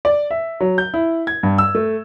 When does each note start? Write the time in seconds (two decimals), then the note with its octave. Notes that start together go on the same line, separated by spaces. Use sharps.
0.05 D5
0.31 E5
0.60 F#3
0.78 G6
0.94 E4
1.27 G#6
1.43 G2
1.58 E6
1.75 A3